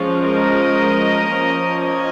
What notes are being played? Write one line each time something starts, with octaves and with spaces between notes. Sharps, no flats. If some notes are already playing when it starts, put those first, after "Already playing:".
Already playing: F3 G#3 C#4 F4
A#4 D#5
F3 A#3 C#4
D#5 G#5